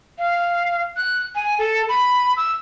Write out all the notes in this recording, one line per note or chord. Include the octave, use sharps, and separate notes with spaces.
F5
F#6
G#5
A4
B5
E6